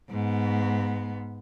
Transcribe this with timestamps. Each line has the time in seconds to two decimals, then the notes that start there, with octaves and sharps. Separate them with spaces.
0.10 G#2 B3